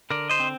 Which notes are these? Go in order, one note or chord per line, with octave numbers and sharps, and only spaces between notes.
D3 A#4 D5
C5 D#5
C4